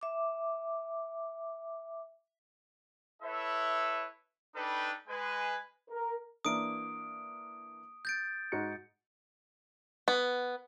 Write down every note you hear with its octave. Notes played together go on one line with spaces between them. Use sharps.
E5 D6
E4 A4 B4 C#5 E5
D4 D#4 A4 B4 G5 B5
G#3 B4 G#5
A#4
E3 A#3 D4 D#6 D7
G6 A6 D7
G#2 F#4 C#7
B3